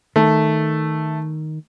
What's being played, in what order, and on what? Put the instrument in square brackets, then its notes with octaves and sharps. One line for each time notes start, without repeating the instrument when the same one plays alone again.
[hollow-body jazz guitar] D#3 [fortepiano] A3